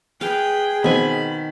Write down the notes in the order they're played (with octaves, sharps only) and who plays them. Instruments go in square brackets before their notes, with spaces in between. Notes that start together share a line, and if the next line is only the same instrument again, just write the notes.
[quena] G#4 [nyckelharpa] B4 G5 [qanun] F5
[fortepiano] B2 C4 [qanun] D#3 G#5 [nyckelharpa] B5